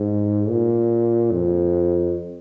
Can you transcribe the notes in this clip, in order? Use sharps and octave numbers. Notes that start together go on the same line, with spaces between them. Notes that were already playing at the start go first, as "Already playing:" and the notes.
Already playing: G#2
A#2
F2